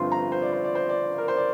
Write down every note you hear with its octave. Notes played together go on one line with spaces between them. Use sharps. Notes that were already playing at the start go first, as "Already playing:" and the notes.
Already playing: G1 G2 F3 C4 F4 C6
A#5
C5
D5
C5
D5
C5
D5
A#4
C5
D5